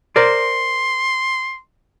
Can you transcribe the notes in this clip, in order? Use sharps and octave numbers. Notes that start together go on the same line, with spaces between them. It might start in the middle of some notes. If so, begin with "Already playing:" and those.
A#4 C5 D5 C6